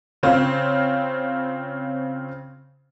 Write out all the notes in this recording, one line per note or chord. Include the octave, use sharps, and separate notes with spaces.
C#3 C4 C#4 F4